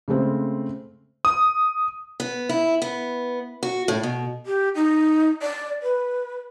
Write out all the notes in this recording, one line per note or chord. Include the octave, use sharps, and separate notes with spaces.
C#3 G#3 A3 C4
D#6
B3
E4
B3
F#4
A2
B2
G4
D#4
D5
B4